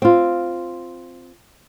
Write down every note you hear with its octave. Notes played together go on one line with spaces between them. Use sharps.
C4 F4